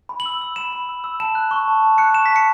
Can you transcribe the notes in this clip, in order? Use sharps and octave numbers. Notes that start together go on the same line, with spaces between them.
B5
F#7
E6
E6
B5 E7
B5
E6
E6
A5 E7
F#6
C#6
A5
A5
F#6 C#7
C#6 E7
B6
A5 C#7